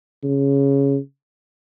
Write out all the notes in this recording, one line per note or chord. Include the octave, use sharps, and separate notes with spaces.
C#3